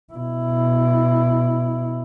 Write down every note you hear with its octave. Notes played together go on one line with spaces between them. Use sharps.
B2 E4